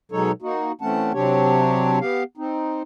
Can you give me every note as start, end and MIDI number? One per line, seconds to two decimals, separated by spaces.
0.12 0.32 47
0.12 0.32 54
0.12 0.32 56
0.12 0.32 63
0.12 0.32 69
0.12 0.32 73
0.42 0.72 58
0.42 0.72 63
0.42 0.72 66
0.81 1.12 52
0.81 1.12 57
0.81 1.12 60
0.81 1.12 61
0.81 1.12 78
0.81 1.12 81
1.14 1.99 48
1.14 1.99 54
1.14 1.99 60
1.14 1.99 62
1.14 1.99 67
1.14 1.99 73
2.00 2.23 59
2.00 2.23 67
2.00 2.23 77
2.37 2.83 60
2.37 2.83 63